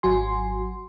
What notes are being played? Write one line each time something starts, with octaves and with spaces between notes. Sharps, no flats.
G#1 F#3 F#4 G#5 C6